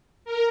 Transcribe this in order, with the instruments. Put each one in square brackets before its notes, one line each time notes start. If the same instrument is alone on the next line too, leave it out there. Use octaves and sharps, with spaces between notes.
[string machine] A#4